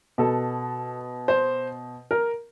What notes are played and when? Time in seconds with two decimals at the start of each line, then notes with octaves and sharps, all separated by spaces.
0.18 B2 A4
1.28 C5
2.11 A#4